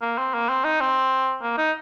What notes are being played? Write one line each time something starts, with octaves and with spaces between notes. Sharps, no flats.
A#3
C4
A#3
C4
D#4
C4
A#3
D#4